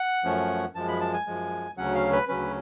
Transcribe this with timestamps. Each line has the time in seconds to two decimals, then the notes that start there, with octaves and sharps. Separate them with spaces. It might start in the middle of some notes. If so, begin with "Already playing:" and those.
Already playing: F#5
0.24 F#2 F3 A3 C#4
0.75 F#2 F3 G#3 A5
0.88 B5
1.01 A5
1.14 G#5
1.27 F#2 F3 G#3
1.77 D2 C#3 F#3 C#4 F#5
1.95 F5
2.12 B4
2.29 D2 C#3 F#3 C#4 B4